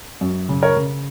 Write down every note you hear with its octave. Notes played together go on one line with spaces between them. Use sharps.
F#2
C#3
A#4 C#5
C#3